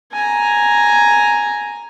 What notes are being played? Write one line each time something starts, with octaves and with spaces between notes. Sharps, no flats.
G#5 A#5